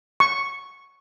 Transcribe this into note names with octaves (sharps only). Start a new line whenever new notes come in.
C#6